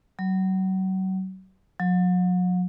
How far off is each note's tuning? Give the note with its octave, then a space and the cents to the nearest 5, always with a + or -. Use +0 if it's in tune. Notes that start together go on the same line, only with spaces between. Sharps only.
F#3 +35
F#3 -40